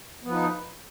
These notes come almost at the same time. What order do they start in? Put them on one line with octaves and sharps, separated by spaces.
B3 F3 B4 D#4